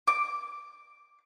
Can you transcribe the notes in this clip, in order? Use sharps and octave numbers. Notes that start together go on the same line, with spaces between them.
D6